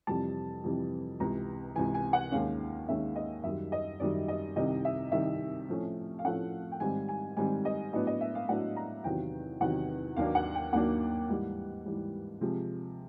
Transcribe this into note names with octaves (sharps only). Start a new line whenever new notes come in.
F2 C3 E3 G3 A5
F2 C3 E3 G3
C#2 C3 E3 A#5
C#2 C3 E3 G#5
G#5
F#5
D#2 D#3 G#3 C#4 F5
D#2 D#3 G#3 C#4 E5
D#5
F#2 D#3 G3 E5
D#5
F#2 D#3 G3 D5
D#5
C2 C3 D#3 D#5
E5
C2 C3 D#3 E5
A2 F3 A3 C#4
F5
A2 F3 A3 C#4 F#5
G5
G#2 D#3 G3 C4 G#5
G#5
G#2 D#3 G3 C4 G#5
D#5
A2 F#3 B3 D4 D#5
D#5
E5
F5
A2 F#3 B3 D4 F#5
A#5
E2 C3 D#3 F#3 G5
E2 C3 D#3 F#3 F#5
D#2 D#3 F#3 A#3 D4 F5
F#5
G5
D#2 D#3 F#3 A#3 D4 F#5
G#2 E3 G3
G#2 E3 G3
C3 F3 G#3